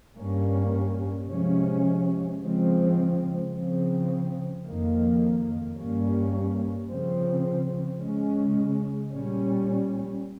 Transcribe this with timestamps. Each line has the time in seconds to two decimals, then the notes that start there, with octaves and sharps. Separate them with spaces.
0.16 G2 G3 A#3 C#4
1.29 C3 F3 G#3 C#4
2.41 C#3 F3 G#3 C4
3.52 C#3 F3 C4
4.64 F2 D#3 A#3
5.77 G2 G3 A#3 C#4
6.89 C#3 F3 C4
8.00 C#3 G#3 C#4
9.13 A#2 G3 C#4